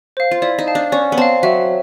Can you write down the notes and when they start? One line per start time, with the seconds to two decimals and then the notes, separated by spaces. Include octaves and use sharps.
0.17 C5 F5
0.31 F4
0.42 E4 D5
0.58 D#4
0.67 F5 A5
0.75 D4
0.92 C#4 D5
1.12 B3
1.18 C4 F5 A5
1.43 F#3 E5